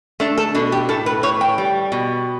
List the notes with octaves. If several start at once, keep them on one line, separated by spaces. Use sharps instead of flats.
A3 D4
A4
B2 D4
G4
A2 A4
B4
A2 C#5
G5
G3
B2